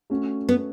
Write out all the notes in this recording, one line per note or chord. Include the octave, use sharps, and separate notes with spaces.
A3 C#4 F#4
B3